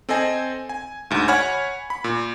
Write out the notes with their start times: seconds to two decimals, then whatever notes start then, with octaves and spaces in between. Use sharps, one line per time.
0.09 C4 A4 C5 D#5 G#5
0.69 G#5
1.11 D2 G#2
1.28 C#5 F#5 G#5 B5 F6 G#6
1.90 B5
2.04 A#2